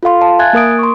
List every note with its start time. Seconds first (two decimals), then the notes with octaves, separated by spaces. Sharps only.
0.03 F4 A4 F5 C6
0.21 F5 A5
0.39 E5 G#5 F#6 G#6 A6
0.53 A#3 A#4 D#6 D7
0.79 C6 C#6